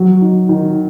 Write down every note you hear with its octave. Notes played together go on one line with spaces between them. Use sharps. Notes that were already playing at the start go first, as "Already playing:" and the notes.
Already playing: F#3
D#4
D#3